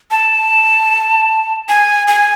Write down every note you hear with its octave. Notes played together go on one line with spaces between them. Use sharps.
A5
G#5
G#5